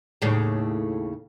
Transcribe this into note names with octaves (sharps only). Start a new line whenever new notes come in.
D#2 A2 C#3